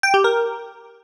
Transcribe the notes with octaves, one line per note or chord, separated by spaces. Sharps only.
G5
G4
A#4